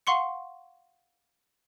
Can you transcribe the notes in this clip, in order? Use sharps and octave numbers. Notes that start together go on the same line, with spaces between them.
F5 F#5 C6 C#6 C#7